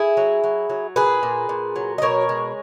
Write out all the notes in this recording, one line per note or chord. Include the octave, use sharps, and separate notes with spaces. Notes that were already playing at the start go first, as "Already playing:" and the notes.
Already playing: E4 G#4
F#3
F#3
F#3
A#2 G#4 B4
A#2
A#2
F#3
D#5
B2 A#4 C#5
G#3